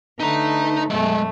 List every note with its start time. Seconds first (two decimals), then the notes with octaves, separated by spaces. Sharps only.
0.20 D3 A3 D#4 B4 A#5
0.90 F#2 B2 G#3 A3 E5